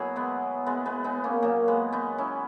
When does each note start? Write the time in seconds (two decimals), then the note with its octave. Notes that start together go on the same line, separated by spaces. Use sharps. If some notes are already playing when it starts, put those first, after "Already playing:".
Already playing: B2 F#3 E4 G#4
0.16 G#3 B3
0.66 G#3 B3
0.86 G#3 B3
1.04 B3 D#4
1.24 A#3 C#4
1.42 A#2 F#3 A#3
1.68 G#3 B3
1.93 B3 D#4
2.18 C#4 E4